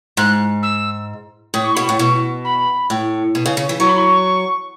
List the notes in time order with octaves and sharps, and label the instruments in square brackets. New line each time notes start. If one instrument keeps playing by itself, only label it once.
[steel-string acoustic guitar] G#2 [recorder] F#6
[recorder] E6
[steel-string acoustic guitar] A2 [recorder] D#6
[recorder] C#6
[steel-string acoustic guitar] B2 [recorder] B5
[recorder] C#6
[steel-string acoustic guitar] A2
[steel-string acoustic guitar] B2 [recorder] C#6
[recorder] B5
[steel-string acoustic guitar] A2
B2
C#3
C#3
E3
[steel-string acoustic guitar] F#3 [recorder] C#6
[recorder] B5
C#6